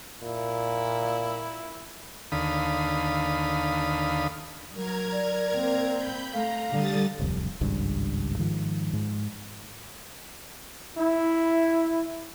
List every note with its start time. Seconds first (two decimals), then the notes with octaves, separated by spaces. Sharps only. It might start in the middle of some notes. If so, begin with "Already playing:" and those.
0.22 A#2 E4
2.32 D#2 D3 F5 B5 D#6
4.73 F#3 A#4 A#5 G#6
5.12 D5
5.54 A#3 C4
5.93 B5 G6
6.33 A3 F5 A#5
6.70 D3 G3 D#6 A6
7.19 D1 C2 F2
7.61 G#1 C#2 G2
8.38 G#2 D#3 F3
8.93 G#2
10.97 E4